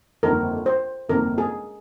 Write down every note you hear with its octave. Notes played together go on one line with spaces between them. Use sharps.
G1 F2 C3 D#3 A#3 A#4
C5
G1 F2 C3 D#3 A#3 A#4
G#4